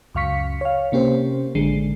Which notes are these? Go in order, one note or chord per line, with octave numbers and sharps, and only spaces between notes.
C#2 F#2 F5 C#6 B6 C#7
C#5 F5
C3 A#3 C#4 G4 C5
A1 D3 G#3 C7